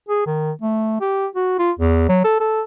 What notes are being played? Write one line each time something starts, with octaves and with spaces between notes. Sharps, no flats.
G#4
D#3
A3
G4
F#4
F4
E2
F#3
A4
A4